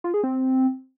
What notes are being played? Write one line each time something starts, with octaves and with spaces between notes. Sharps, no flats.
F4
G#4
C4